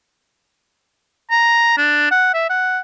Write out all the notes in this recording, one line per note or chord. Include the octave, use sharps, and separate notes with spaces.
A#5
D4
F#5
E5
F#5